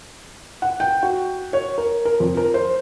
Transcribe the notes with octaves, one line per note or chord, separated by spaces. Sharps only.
F#5
G5
F#4
C#5
A#4
A#4
F2
A#4
C5